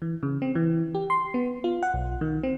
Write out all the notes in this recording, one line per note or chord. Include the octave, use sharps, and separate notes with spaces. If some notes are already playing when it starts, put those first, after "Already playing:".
E3
C#3
C4
E3
G4
C6
B3
F4
F#5
B1
D#3
C4